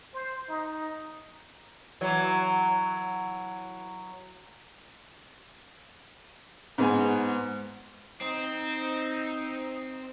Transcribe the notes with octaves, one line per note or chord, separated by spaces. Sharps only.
C5
D#4
E3 F#3
G#2 B3 G#5
C4 D#4